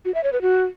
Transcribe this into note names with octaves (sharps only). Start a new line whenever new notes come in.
F#4
E5
C#5
B4
F#4